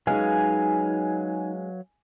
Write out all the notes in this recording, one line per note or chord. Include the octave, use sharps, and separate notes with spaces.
F#3 G#3 C#4 D#4 G#4 B4 F5 G#5